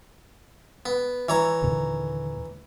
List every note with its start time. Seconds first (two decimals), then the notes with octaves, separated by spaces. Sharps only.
0.86 B3
1.29 E3 C#5 A#5
1.63 D#2 A#2 D3